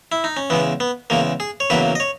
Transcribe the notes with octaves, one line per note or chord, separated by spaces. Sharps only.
E4
D#4
C#4
E2 C#3 G#3 B3
B3
E2 C#3 G#3 A#3
G#4
C#5
E2 C#3 F#3 A#3 B4
D#5
C#5